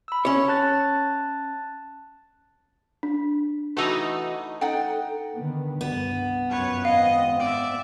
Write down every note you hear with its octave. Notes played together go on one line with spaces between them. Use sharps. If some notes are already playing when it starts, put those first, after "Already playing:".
B5 E6
C#4 C#5
A5 F#6 A6
D4
E3 A3 D#4 F#4 B4
D#4 A4 F#5 G5
D3 D#3 B3
C2 G2 B3
F#2 F3 B4 C#5
G#1 C4 D#5 F5
D5 E5